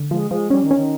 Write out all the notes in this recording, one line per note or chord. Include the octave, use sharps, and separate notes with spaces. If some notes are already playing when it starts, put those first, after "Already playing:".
Already playing: D3
F3 G#3
F3 G#3
G3 C#4
D#3
C#4
D#3